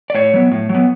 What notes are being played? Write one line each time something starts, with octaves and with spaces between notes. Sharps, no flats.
D5
A2 C#5
F#3 B3
A2
F#3
B3